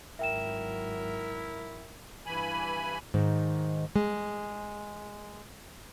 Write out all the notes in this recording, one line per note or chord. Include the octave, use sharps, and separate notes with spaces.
G#1 F#3 E4 A#4 E5 G5 E7
G2 E3 G#5 B5
G#2 D#3
G#3